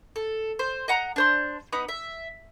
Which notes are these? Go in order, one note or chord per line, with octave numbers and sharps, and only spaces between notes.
A4
C5
D#5 F#5 A#5
D4 C5 C6
B3 D#4 B5 D#6
E5